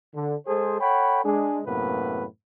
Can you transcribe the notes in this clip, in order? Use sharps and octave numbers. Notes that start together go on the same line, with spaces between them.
D3
G#3 G#4 A4 C5
A4 C#5 F#5 G5 B5
G#3 D4 G#4
F#2 A2 C3 A#3 B3 B4